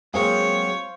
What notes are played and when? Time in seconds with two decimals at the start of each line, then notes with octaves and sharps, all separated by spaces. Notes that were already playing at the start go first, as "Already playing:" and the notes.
0.14 F#3 G#3 A#3 C4 G#4 C5 C#5 F5